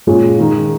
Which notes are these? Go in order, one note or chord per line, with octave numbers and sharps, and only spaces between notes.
A#2 G#3 C#4 F4
D#3 G#3 D#4